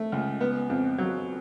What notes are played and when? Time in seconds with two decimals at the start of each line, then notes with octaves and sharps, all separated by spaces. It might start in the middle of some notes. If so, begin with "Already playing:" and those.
Already playing: A3
0.12 C#2
0.41 B3
0.70 F2
0.98 F#3